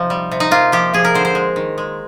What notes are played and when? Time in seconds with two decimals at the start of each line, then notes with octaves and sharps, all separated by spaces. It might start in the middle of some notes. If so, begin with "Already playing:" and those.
Already playing: C3 F3 D#4
0.10 G3
0.31 C3
0.40 D#4
0.51 A#3 F4
0.72 F3 G4
0.93 F3 G#4
1.05 A#4
1.14 D3 C5
1.25 C5
1.35 G#3
1.56 D#3
1.78 G#3